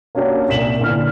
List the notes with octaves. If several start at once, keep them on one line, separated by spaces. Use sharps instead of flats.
A#3 C#4 D4 F#4 G4 A#4
C2 A#2 B6 E7 F#7
A#2 D3 B3 E4 F6